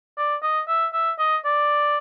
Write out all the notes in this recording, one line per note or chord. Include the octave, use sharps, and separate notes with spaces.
D5
D#5
E5
E5
D#5
D5